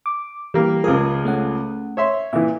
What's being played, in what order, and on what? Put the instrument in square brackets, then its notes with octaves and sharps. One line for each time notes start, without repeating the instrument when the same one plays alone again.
[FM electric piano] D6
[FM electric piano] E3 [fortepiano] G3 A#3
[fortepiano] C#2 F3 G#4 [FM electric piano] A#4
[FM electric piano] A3 C#4 F#5
[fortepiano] C#5 E5 C6
[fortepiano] A#2 E3 [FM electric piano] E5